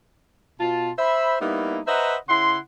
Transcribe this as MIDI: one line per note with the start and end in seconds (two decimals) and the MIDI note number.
0.60 0.91 47
0.60 0.91 65
0.60 0.91 81
0.99 1.36 72
0.99 1.36 76
0.99 1.36 83
1.41 1.79 55
1.41 1.79 58
1.41 1.79 59
1.41 1.79 63
1.41 1.79 64
1.87 2.16 71
1.87 2.16 72
1.87 2.16 75
1.87 2.16 76
1.87 2.16 78
1.87 2.16 82
2.29 2.59 49
2.29 2.59 64
2.29 2.59 78
2.29 2.59 84